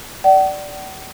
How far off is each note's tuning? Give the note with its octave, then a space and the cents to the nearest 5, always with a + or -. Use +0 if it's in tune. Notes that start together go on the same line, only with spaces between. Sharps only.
D5 +0 F#5 +45